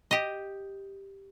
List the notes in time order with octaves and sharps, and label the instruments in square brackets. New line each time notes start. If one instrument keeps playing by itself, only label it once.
[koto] G4 D#5